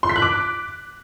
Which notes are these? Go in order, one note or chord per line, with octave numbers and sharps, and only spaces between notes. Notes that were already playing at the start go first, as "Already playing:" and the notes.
C6
B6
F#6
D6